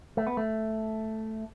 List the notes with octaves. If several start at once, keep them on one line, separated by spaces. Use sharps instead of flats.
A3
B3
A3